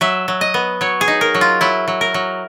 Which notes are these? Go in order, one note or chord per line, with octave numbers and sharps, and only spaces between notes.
F#3 E5
F#3
D#5
B3
F#3 C#5
G#4
D#4
A#4
F#3
F4
F#3 E4
F#3
A#4
F#3